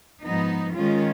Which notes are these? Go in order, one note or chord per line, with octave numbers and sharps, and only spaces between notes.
G#2 F3 B3 D#4
D#3 G#3 C#4 F4